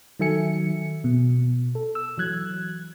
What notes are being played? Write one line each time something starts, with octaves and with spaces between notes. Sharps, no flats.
D#3 F#3 A4 E5 G#5 C#7
B2
A4
E6
E3 F#3 F#6 G#6